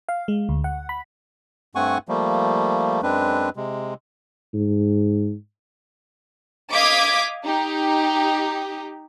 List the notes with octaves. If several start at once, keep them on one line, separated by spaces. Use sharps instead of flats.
F5
G#3
D2
F#5
B5
G2 A3 C4 F#5 G#5 C#6
F3 G3 A3 A#3
F#2 G#3 C4 D4 B4
C3 G#3
G#2
D#5 F5 D6 G#6 B6 D7
D#4 G4